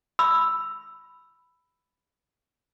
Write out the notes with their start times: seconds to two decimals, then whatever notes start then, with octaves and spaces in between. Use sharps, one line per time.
0.19 B5 E6